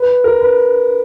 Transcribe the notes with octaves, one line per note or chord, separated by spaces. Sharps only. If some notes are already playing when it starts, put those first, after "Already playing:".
Already playing: B4
A#4
B4